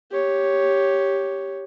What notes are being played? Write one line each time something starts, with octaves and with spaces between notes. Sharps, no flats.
G4 C#5